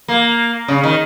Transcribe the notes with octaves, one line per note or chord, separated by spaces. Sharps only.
A#3
C#3
D#3